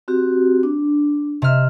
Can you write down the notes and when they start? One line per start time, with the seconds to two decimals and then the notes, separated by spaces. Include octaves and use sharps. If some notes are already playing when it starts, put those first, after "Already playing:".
0.08 C4 F#4 G4
0.63 D4
1.42 C3 D#5 E5 F6